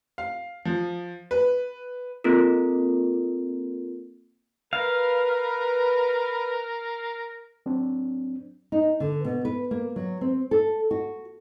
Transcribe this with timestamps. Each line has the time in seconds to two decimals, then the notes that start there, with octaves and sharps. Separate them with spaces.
0.18 F5
0.65 F3
1.31 B4
2.24 A#3 C4 F4 A4 A#4
4.73 A#4 B4 F5
7.66 F#3 C4 D4
8.72 D#4
9.00 D3
9.25 B2
9.45 B4
9.71 A#3
9.96 F#3
10.21 C4
10.51 A4
10.91 F#4